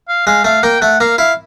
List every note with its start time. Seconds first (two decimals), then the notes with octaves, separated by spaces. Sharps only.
0.09 F5
0.27 G#3 F5
0.44 A3 F5
0.63 A#3 G5
0.81 A3 F#5
1.00 A#3 F5
1.18 E4 F5